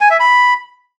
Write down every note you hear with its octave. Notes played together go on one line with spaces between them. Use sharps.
G#5
E5
B5